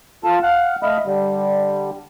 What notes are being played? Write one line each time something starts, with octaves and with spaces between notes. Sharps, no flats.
F4 A4 A5
F5 F#5
A3 D#5 F5 B5
D3 G3